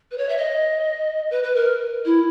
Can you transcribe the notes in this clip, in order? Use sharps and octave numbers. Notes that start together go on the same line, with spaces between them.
B4
C#5
E5
D#5
B4
B4
A#4
E4